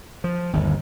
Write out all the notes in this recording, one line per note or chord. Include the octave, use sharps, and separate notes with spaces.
F3
G1 D#2